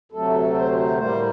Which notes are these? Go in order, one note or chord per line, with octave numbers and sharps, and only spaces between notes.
D2 C3 F#3 A3 A4
C5
C5
A2 G3 A#3 C5